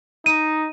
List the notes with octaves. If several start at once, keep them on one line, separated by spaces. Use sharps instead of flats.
D#4 D#7